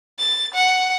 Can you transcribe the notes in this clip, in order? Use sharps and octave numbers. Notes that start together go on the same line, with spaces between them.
A6
F#5